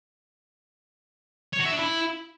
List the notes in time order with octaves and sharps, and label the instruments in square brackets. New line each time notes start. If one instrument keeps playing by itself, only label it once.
[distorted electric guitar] C#5
F#4
E5
D4
E4